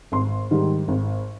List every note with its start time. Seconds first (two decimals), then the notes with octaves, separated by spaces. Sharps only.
0.12 G#1 C6
0.51 G#2 D#3 G3
0.88 G#1